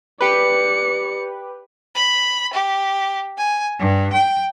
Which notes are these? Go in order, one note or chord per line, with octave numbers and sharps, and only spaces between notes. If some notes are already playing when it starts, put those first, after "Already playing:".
G4 B4 D5 C#7
B5
G4
G#5
G2
G5